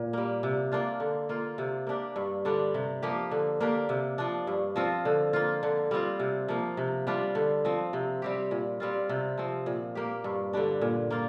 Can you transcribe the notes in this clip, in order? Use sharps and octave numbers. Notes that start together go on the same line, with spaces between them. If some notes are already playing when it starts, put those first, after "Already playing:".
Already playing: A#2
G3 A#3
C3
A#3 D4 F4
D3
A#3 F4
C3
A#3 D4 G4
G2
D3 G3 D4
C3
F3 A#3 G4
D3
A#3 D4 G4
C3
F3 D4
G2
F3 C4 F4
D3
A#3 F4
D3
G3 C4 F4
C3
F3 A#3
C3
G3 D4 F4
D3
F3 C4
C3
G3 C4 G4
A#2
G3 C4 F4
C3
F3 C4
A#2
A#3 G4
G2
D3 G3 D4
A#2
A#3 F4